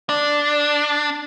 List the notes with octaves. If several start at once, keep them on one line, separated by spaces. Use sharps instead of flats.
D4